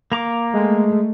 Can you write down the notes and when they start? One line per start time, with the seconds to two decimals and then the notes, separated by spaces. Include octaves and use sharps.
0.12 A#3 A#5 D6
0.54 G#3 A3